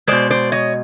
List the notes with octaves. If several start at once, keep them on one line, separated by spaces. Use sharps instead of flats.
B2 G#3 C5 D5
C5 D5
C#5 D#5